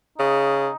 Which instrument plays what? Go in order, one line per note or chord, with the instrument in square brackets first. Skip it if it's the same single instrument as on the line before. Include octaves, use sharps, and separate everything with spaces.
[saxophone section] C#3 [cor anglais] D#4